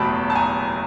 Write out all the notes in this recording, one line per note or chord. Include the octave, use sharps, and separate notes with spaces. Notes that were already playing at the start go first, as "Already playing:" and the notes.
Already playing: F#1 E2 B2 F#3 A3 G5 A5 B5
A5
G#5 A#5